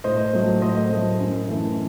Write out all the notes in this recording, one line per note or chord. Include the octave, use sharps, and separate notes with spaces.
A2 C5 D#5
F#3 A3
A2 C5 D#5
F#3 A3
F#2
E3 A3